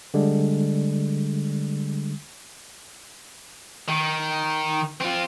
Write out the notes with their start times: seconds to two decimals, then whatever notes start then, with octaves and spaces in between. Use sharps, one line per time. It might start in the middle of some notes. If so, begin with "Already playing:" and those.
0.14 D3 G3 G#3
3.89 D#3
5.01 C4 F4